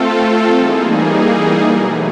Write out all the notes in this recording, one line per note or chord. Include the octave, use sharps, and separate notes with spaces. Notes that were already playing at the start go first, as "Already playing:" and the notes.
Already playing: A3 C4 F4 A4
E3 G3 A#3 D#4 G#4
B2 F#3 A3